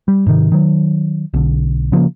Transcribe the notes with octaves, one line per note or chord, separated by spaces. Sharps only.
G3
G#2 C3 D#3
D#3 F#3
B1 D3
C#3 F3 F#3 A#3